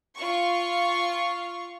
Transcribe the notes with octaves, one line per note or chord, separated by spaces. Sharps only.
F4 C#6